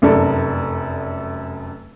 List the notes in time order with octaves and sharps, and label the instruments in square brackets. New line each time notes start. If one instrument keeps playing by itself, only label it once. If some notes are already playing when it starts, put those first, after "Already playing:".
[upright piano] F1 F#2 A4 D5